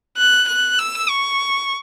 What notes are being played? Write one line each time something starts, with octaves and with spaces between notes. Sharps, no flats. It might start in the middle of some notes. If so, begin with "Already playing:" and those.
F#6
F#6
E6
C#6